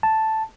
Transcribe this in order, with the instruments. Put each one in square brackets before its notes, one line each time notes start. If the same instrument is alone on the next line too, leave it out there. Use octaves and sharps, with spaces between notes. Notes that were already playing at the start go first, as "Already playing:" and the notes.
[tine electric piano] A5